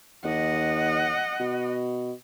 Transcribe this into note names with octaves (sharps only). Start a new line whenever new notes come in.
D#2 D#5 F#5
B2